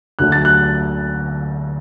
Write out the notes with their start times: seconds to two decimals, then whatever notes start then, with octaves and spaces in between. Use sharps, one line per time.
0.19 D2 D3 F#3 A3 F#6
0.32 A6
0.45 F#6